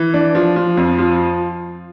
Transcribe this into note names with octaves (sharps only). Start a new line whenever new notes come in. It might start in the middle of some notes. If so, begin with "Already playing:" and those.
Already playing: E3
D4
F3
F3
F2
F3